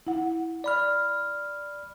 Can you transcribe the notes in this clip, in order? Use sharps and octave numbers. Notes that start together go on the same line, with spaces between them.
E4 F#5
D5 B5 F6